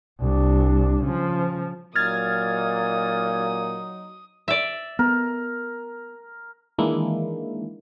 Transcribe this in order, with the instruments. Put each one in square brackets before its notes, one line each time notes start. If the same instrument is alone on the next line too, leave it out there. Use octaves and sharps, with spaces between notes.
[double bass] C2 D4
C#3 F3
[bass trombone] A#2 [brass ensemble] F#3 D#4 [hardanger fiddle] D#6 [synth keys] F6 G#6 A6
[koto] D5 E5
[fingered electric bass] B3 [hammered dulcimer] A#4
[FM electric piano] D#3 E3 G#3 A#3 D4 E4